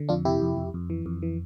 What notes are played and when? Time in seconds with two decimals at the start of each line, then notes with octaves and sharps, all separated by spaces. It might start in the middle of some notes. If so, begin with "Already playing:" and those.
Already playing: D3
0.09 F2 D4 F4
0.25 C3 E4 G4
0.42 F2
0.57 F2
0.74 F2
0.90 E3
1.06 F2
1.22 E3